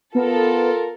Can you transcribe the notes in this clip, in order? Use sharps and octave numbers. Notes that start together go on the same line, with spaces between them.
B3 F4 A4 A#4